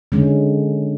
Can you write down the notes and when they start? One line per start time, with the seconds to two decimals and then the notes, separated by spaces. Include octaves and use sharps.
0.12 D3 G#3 C#4